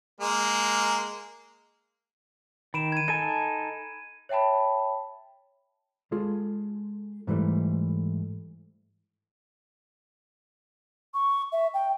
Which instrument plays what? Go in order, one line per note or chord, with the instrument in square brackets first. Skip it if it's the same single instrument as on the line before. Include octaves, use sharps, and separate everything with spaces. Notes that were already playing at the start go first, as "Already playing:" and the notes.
[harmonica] G#3 A#3
[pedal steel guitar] D#3 [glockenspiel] B5 D7 E7
[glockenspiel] G#6 D#7
[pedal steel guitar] D#4 A4 G#5 [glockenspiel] D#7
[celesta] C#5 E5 G5 A5 B5
[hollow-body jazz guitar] G#3 F4 G#4 A4
G#2 E3 G3 A3
[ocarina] C#6
E5
G5